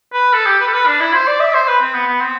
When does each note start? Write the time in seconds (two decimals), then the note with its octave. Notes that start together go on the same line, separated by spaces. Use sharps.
0.13 B4
0.33 A4
0.46 G4
0.60 B4
0.67 A4
0.73 B4
0.86 D4
1.00 E4
1.13 C5
1.27 D5
1.40 E5
1.53 C5
1.67 B4
1.81 C4
1.94 B3
2.07 B3
2.21 C4